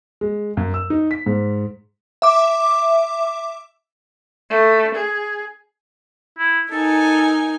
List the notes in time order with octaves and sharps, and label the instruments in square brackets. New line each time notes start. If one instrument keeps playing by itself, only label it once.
[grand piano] G#3
F#2
E6
D#4
B6
G#2
[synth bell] E5 D6
[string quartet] A3
G#4
[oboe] E4
[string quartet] D#4 A#4 G#5 [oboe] A4